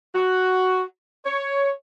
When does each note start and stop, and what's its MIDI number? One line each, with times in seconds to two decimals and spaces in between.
0.15 0.83 66
1.26 1.71 73